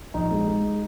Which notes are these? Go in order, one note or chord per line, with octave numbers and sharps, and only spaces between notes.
A#1 D#4
G#3
G#3